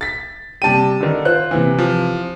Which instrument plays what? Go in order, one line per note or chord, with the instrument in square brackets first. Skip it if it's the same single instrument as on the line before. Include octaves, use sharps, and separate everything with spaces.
[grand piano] A6 B6
[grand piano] C3 G3 G5 [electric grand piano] A5 D#7
[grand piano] D3 D#3
[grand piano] F4 C5 [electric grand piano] F#6
[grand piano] C3 E3
[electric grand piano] F3